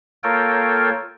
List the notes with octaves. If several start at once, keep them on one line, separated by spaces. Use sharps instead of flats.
A#3 F4 A4 A#4 C#5 G5